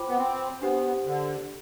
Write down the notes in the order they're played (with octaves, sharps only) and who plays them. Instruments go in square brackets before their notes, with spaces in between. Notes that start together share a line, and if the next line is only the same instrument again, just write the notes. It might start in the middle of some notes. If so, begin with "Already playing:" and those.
Already playing: [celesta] F4 C5 G5 B5 D6
[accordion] B3
C4
[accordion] B3 [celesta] D4 G4 C5
[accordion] D3